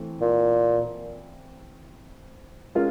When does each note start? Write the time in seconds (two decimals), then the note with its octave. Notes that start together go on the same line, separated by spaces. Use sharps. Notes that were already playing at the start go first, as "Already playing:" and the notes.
Already playing: E3 A3 C4
0.21 A#2
2.75 G#3 C#4 F4 A#4